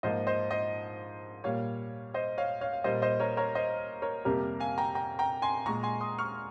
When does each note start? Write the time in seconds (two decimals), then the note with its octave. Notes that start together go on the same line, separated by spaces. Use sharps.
0.03 G#2 F3 A#3 C5 D#5
0.27 C5 D#5
0.51 C5 D#5
1.44 A#2 G3 A#3 C#5 F5
2.14 C5 D#5
2.38 C#5 F5
2.61 C#5 F5
2.73 F5
2.84 A#2 G3 A#3 C5 D#5
3.02 C5 D#5
3.20 A#4 C#5
3.37 A#4 C#5
3.55 C5 D#5
4.02 A#4 C#5
4.25 F2 C3 G3 A#3 G4 A#4
4.60 F5 G#5
4.78 G5 A#5
4.95 G5 A#5
5.19 G5 A#5
5.42 G#5 C6
5.66 A#2 G#3 A#5 C#6
5.83 G#5 C6
6.01 C6 D#6
6.19 C#6 F6